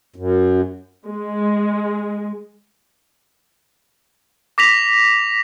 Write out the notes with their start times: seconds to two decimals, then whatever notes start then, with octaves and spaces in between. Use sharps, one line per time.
0.16 F#2
1.07 G#3
4.58 D6 A#6 B6 F7